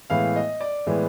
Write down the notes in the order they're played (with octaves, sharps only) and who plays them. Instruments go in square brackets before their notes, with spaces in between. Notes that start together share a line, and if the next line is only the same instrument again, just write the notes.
[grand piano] A2 E3 G#3 B3 F5
D#5
D5
A2 E3 G#3 B3